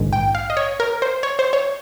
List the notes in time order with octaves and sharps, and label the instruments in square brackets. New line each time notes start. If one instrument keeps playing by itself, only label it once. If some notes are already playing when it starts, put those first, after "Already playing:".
Already playing: [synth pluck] A#1 G#2 D#3
G5
F5
D#5
C#5
A#4
C5
C#5
C5
C#5